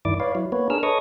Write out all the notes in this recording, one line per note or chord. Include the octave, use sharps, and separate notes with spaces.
G2 D#3 E4 D5 D6
B4 C#5 D5 F5
F#3 E4
A#3 B3 B4 C#5
D4 G#4 A#4 E6 F6
A4 B4 C#5 D#5 C#6 D#6